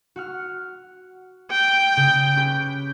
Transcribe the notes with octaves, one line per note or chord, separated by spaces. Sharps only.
F#4 F#5 F6
G5
C#3
C#4 G4 B4